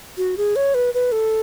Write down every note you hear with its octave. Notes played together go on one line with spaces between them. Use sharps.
F#4
G#4
C#5
B4
B4
A4